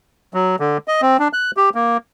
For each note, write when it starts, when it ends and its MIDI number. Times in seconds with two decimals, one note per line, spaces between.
0.34 0.56 54
0.60 0.78 50
0.88 1.01 75
1.02 1.17 60
1.19 1.28 62
1.33 1.51 90
1.57 1.69 67
1.75 1.97 58